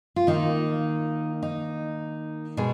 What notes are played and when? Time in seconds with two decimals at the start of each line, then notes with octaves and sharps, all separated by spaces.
0.16 F4
0.27 D#3 A#3 D#4
1.43 D#4
2.57 B2 G#3